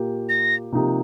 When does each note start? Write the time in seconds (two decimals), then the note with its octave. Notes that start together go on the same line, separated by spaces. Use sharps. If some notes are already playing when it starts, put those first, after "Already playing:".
Already playing: A#2 A#3 G4
0.29 A#6
0.72 C3 F3 A#3 D#4 G4